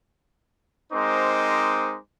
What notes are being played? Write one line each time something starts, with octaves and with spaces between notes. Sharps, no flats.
G#3 C4 D#4 A#4 C5 D6